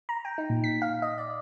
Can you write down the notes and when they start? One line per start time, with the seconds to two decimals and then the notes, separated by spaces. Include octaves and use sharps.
0.09 A#5
0.25 G5
0.38 D#4
0.50 A#2
0.64 B6
0.82 F5
1.02 D#5
1.18 D5